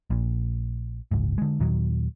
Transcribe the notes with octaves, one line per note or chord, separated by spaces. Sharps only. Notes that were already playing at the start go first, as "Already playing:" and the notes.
A#1 A#2
F#1 C#2 G#2
D3 G#3
D#2 A#2 D#3 F#3